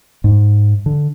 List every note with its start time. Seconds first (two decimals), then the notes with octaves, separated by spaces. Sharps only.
0.24 G#2
0.86 D3